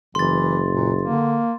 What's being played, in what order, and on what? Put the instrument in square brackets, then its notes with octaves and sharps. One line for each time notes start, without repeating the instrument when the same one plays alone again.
[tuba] F#1 [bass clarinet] E3 [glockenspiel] C6 A6
[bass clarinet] A#2
[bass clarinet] D3 [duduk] A#3